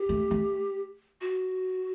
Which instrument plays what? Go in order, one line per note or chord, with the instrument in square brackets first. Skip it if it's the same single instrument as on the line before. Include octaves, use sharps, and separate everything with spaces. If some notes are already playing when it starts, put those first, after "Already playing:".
Already playing: [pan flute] G4
[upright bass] A3
A3
[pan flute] F#4